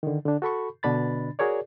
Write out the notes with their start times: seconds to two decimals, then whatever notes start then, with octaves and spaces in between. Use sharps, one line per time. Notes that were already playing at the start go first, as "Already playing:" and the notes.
0.03 D3 D#3
0.25 D3 D4
0.42 F#4 A4 B5 C#6
0.83 B2 D3 D4 B5 A6
1.39 F#4 G#4 A#4 C#5 D5